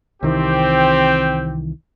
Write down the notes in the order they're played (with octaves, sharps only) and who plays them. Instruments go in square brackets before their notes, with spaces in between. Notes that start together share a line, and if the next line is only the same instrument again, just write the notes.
[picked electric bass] C2 D#3 E3 [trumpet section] C4 G4